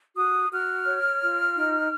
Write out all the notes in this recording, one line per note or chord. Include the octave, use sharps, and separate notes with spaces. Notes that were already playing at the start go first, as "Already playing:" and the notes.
F#4 D#6
F#4 F6
C#5
F4
D#4